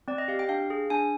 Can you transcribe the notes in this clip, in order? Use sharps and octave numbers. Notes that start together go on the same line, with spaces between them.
C4 D5
D#5
G4 F5
G5
D4 F5
G#4
D4 G#5